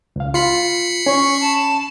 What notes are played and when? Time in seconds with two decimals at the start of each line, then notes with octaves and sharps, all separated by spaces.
0.16 C#2 F5
0.34 F4 B5 C7 C#7
1.06 C#4 C#6
1.40 A5